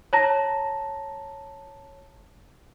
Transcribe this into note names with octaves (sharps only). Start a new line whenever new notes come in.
C#5 A5 A#5 A#6